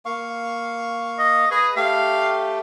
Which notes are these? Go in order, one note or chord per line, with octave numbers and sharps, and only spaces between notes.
A#3 F5 C#6
D#5
G#4 B4 D#6
A3 G4 F5